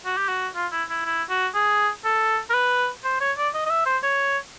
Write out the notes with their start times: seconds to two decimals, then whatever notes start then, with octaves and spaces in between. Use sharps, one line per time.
0.06 F#4
0.17 G4
0.28 F#4
0.55 F4
0.72 E4
0.90 E4
1.06 E4
1.30 F#4
1.55 G#4
2.05 A4
2.50 A#4
2.54 B4
3.04 C5
3.21 C#5
3.38 D5
3.54 D#5
3.66 D#5
3.70 E5
3.86 C5
4.03 C#5